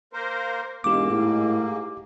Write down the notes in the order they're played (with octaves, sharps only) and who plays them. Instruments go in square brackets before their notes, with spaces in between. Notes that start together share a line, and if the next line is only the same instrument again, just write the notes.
[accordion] A#3 A#4 C5
[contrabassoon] E1 [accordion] G#2 A#3 [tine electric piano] G4 D6
[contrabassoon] A2